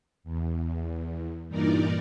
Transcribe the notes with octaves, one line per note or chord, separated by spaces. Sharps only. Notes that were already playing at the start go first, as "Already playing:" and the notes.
E2
G2 A#2 E3 D#4 A#4 D5